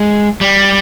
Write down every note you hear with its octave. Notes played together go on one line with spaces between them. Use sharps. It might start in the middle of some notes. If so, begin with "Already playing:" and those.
Already playing: G#3
G3